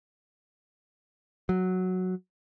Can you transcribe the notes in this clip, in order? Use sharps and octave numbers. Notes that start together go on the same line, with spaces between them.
F#3